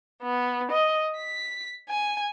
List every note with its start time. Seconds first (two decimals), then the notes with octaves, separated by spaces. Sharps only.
0.22 B3
0.71 D#5
1.17 B6
1.89 G#5